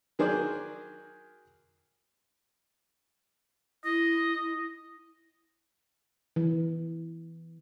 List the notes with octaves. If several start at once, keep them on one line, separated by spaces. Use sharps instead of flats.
D#3 F#3 G#4 A#4 C5 D5
E4 D#5
E3